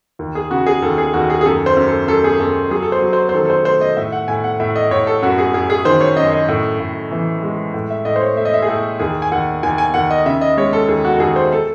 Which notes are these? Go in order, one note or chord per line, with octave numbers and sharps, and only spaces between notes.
D#2
G#4
C#3 F#4
G#4
D#2 A4
G#4
D#2 F#4
G#4
G#4
F#2 A4
C5
F#2
A4
F#2 A4
G#4
F#2 A4
F#3 G#4
A4
C5
F#3
C5
C5
D#3 A4
A4
C5
A3 C5
D#5
A2 E5
F#5
A2 G#5
F#5
A2 E5
D#5
A2 C#5
A4
F#2 F#4
G#4
F#2 G#4
G#4
D#3 C5
C#5
F#2 D#5
D#5
A2
A2
E3
G#3
A2
E5
A2 D#5
C5
C#5
A3 E5
D#5
E5
G#4
A2 A4
D#2 G#4
G#5
D#2 F#5
D#2 G#5
G#5
D#2 F#5
D#5
C#3 E5
D#5
G#3 C#5
A4
D#2 G#4
F#4
A4
D#2 G#4
C5
A4